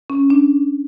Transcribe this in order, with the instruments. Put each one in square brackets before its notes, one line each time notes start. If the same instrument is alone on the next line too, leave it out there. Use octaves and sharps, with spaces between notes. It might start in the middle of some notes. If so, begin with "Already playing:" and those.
[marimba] C#4
D4